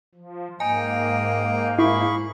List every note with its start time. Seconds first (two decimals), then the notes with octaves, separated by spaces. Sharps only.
0.15 F3
0.60 G#2 A#3 D#5 G5 G#5 A#5
1.79 E4 G#4 B5 C#6